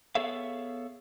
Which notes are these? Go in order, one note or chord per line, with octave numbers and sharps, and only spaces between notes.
B3 G#4 A4 C#5 E5 F5